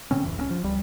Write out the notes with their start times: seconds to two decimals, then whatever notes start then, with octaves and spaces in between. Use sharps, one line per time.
0.11 A2 D3 C4 C#4
0.24 D1 F2 E3
0.37 C#2 A#3 C#4
0.50 F3
0.63 D1 C#2 G3